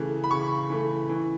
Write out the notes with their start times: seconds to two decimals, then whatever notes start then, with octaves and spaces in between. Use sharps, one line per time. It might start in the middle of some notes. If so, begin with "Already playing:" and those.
Already playing: C#3 E3 A3
0.24 B5
0.31 C#3 C#6
0.70 E3 A3
1.09 E3